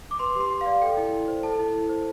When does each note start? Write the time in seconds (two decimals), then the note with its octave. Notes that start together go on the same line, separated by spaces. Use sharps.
0.11 D6
0.19 B4 C6
0.35 G4
0.41 C6
0.50 G4
0.61 F5
0.66 D5
0.82 A4 G5
0.97 E4
1.13 E4
1.28 C5
1.43 A4 A5
1.59 E4
1.74 E4
1.89 C5